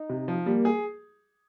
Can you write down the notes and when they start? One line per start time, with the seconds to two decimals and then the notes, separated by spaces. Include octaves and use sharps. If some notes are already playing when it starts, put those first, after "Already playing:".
Already playing: D#4
0.09 C3
0.28 F3
0.46 G3 A#3
0.65 G#4